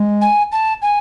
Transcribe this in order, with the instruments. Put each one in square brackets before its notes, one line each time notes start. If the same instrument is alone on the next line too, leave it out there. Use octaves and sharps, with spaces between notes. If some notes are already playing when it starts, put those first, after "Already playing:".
Already playing: [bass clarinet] G#3
[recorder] G#5
A5
G#5